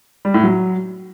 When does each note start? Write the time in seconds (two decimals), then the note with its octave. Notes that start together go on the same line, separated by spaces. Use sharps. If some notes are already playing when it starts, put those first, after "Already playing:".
0.25 G3
0.34 A2
0.44 F#3